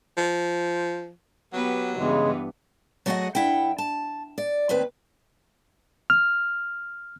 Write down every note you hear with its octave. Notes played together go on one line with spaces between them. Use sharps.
F3
F#3 B3 G4 B4
G2 C#3 E3 G#3 B3
F#3 A3 F#4 G#4 D#5 F#5
G2 E4 F#5 G5
A5
D5
D#2 A2 C4 B4
F6